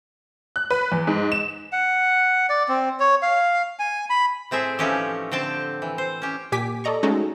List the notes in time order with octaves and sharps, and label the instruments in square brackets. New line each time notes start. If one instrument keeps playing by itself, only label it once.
[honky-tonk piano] F#6
B4
E2
G#2
E7
[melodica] F#5
D5
C4
C#5
F5
G#5
B5
[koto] A2 C4 G#4 E5
E3 F3 A3 C#4 D#4 G4
D3 C4 G5 A5
E3
C5
C#4 G4
[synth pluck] A#2 G4 G#5 D6 B6
A4 D5 D#5 A#5 C#6
G#3 A3 C#4 D#4 F#4 A4